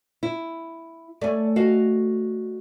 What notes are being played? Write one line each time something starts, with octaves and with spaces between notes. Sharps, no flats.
E4
A3 C#4 D5
F#4 D#5 F5